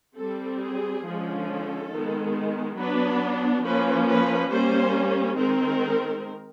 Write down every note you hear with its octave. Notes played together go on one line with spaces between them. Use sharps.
G3 C4 A4
G#4
D3 F3 G#3 C#4
A4
D#3 G#3 B3
F#3 B3 D4 B4
F3 A#3 C#4 B4
B4
G3 A#3 C#4 C5
D#3 G#3 C4 A#4